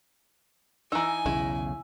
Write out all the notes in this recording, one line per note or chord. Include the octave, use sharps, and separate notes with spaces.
E3 D#4 G#5 A#5 E6
B1 E2 C#3 E4